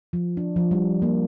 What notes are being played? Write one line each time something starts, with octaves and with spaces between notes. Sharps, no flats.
F3
D4
F3
G3
A#3